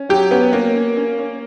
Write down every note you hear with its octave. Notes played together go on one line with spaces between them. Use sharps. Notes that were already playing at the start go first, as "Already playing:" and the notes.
Already playing: C#4
F#3 G4
B3 C#4
A#3 C#4
C#4
C#4
C#4